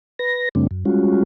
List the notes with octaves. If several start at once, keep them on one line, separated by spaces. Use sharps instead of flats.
B4 A#6
F#2 C#3 G3 A3 C4 D4
F#2
G3 G#3 C#4 F4 F#4